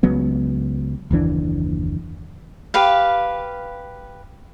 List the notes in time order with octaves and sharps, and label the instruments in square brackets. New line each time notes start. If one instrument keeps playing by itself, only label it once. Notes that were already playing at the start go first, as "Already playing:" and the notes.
[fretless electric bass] C#2 C#3 F#3 B3
F#1 D#2 E3 D4
[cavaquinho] G4 B4 F5